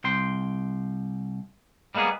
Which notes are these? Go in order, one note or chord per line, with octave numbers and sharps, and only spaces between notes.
C2 G5 C6
G3 G#3 A#3 B3 G#4